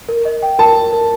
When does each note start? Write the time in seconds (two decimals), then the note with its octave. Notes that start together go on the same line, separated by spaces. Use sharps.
0.09 A#4
0.25 D#5
0.42 G5
0.59 A#4 A5
0.75 A#4
0.93 A#4